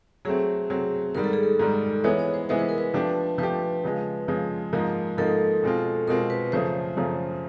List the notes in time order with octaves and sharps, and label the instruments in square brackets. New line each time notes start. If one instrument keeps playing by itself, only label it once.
[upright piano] F#3 A3 C4 [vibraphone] G#4
[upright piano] F#3 A3 C4
[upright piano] G#2 D#3 G3 [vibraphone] A#4
[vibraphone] A4
G#4
A4
[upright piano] G#2 D#3 G3
[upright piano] E3 G#3 B3 E4 [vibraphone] C#5
[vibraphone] C#5
C5
[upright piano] E3 G#3 B3 E4 [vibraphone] C5
[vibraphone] B4
A#4
B4
[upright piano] F3 A3 D4 G4
[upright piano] F3 A3 D4 G4 [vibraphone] B4
[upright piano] C#3 F3 G#3
C#3 F3 G#3
G#2 F3 A#3 D#4
[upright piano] G#2 F3 A#3 D#4 [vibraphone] A4
[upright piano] B2 G#3 C4 F4
[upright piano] B2 G#3 C4 F4 [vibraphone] A#4
[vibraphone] B4
[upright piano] F#2 C#3 F3 A3 [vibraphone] C5
[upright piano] F#2 C#3 F3 A3